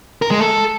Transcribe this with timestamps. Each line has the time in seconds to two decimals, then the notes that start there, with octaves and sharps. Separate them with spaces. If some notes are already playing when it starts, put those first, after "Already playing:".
0.22 A#4
0.31 G#3
0.40 A4